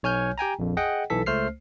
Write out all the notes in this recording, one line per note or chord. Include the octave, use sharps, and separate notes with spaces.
B1 C#5 G#5 F6 G6
G4 G5 G#5 A#5
A#1 F2
G#4 D#5 F#5 G5
B1 E3 A4 B6
C#2 A3 C5 F6 C7